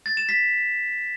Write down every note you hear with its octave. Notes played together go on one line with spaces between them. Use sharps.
A6
E7
B6